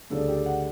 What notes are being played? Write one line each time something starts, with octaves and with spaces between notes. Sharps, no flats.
D2 C#3 G3 D4 A4
G4
F#5